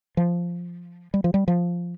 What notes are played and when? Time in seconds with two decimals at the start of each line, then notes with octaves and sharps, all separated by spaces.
0.17 F3
1.14 G3
1.24 F3
1.34 G3
1.48 F3